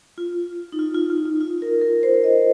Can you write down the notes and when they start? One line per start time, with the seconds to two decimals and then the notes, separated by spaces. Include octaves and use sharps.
0.18 F4
0.72 D#4
0.79 F4
0.95 F4
1.10 F4
1.26 D#4
1.41 F4
1.62 A#4
1.81 A#4
2.03 C5
2.24 D#5